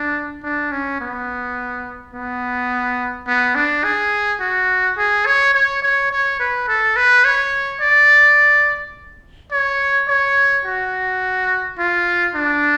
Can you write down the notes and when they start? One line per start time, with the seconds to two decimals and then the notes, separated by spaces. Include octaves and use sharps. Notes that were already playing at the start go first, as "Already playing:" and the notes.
Already playing: D4
0.43 D4
0.72 C#4
1.00 B3
2.13 B3
3.27 B3
3.55 D4
3.84 G#4
4.40 F#4
4.98 G#4
5.26 C#5
5.55 C#5
5.83 C#5
6.11 C#5
6.39 B4
6.68 A4
6.96 B4
7.25 C#5
7.81 D5
9.52 C#5
10.08 C#5
10.65 F#4
11.79 F4
12.35 D4